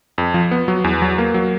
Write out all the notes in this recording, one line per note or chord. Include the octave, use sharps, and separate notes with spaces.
F2
F3
B3
F#3
E2
F#3
A#3
F#3